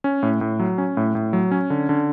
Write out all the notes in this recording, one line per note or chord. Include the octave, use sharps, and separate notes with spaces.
C#4
A2
A2
F#3
C#4
A2
A2
F#3
C#4
D3
D3